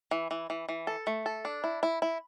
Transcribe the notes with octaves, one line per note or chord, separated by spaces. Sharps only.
E3
E3
E3
E3
A4
A3
A4
D4
E4
E4
E4